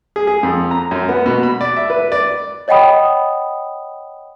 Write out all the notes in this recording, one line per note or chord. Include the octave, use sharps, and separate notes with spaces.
G#4
G#4
F2
A#5
F#2
B3
B2
B5
D5
E5
B4
D5
C#5 D#5 F#5 G5 B5 D#6